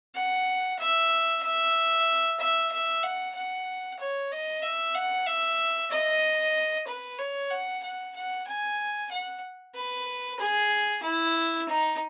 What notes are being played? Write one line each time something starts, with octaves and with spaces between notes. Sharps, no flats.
F#5
E5
E5
E5
E5
F#5
F#5
C#5
D#5
E5
F#5
E5
D#5
B4
C#5
F#5
F#5
F#5
G#5
F#5
B4
G#4
E4
D#4